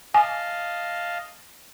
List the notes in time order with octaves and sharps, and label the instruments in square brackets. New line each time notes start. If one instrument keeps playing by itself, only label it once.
[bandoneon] D#5 F5 A5 [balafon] G#5